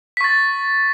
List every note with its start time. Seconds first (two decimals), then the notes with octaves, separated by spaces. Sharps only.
0.17 B6
0.21 C#6
0.24 A6